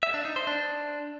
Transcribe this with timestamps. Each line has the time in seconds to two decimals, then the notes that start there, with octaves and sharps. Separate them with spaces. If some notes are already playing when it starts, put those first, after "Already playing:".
0.03 E5
0.14 D4
0.25 D#4
0.36 C5
0.47 D4